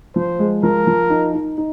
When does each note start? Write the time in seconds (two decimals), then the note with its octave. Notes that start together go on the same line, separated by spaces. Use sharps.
0.16 F3 C5
0.39 G#3
0.63 F3 A#4
0.87 F3
1.10 D#4
1.34 D#4
1.58 D#4